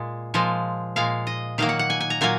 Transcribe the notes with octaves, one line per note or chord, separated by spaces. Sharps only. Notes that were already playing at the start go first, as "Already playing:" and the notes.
Already playing: A#2 G#3
A#2 F3 G#3
A#2 G#3 F5
D#5
D#3 F#3 A#3 F5
F#5
F#5
G#5
G#5
A#5
A#2 F#3 A#3 G#5